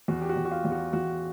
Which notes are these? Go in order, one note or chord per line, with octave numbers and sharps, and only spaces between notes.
E2 F#4
G4
F#4
E2
F#4
F4
E2
F#4
E2 F#4